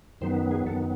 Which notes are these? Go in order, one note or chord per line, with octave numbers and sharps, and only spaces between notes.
F#2 D#3 F#3 B3 C5
G#4
F#2 D#3 F#3 B3 A4